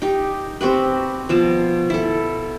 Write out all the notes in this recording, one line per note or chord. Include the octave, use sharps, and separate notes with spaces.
D#4 G4
C4 F#4 G4 B4
B2 F3 A5
E4 A4